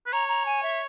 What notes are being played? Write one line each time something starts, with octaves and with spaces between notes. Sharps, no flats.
B4
C#5 A#5
A#5
G#5
E5